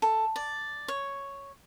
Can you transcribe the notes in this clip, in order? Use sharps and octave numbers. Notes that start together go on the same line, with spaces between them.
A4
D5
C#5